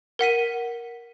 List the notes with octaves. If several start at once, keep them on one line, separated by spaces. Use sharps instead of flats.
A#4 F#5 B6 D#7